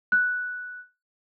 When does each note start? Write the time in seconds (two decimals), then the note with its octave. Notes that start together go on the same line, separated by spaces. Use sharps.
0.12 F#6